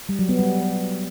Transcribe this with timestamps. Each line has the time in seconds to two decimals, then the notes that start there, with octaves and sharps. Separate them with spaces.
0.09 G3
0.19 F#3
0.29 B3
0.39 G3